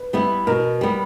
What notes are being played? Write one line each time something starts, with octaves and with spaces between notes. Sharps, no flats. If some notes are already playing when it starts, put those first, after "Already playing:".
Already playing: B4
G3 B3 E4
B2 A#4
G3 B3